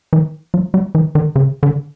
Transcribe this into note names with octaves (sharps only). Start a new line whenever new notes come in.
E3
F#3
G3
E3
D#3
C#3
D3